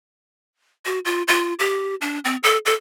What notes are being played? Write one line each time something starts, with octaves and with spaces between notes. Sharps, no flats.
F#4
F4
F4
G4
D4
C4
A4
A4